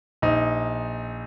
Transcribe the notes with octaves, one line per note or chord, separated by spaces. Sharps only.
A#1 D#4